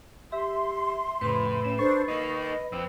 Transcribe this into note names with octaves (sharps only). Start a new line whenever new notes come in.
G4 E5 C6
F2 A2 C#3 B4 B5
C#4 E7
D4 A4 C5 C#6 A6 C7
A#3 D#4 D#5
F2 C4 E6